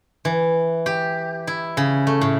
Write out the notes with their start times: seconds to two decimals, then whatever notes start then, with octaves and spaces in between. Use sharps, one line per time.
0.25 E3
0.86 G4
1.47 E4
1.77 C#3
2.07 A3
2.21 A2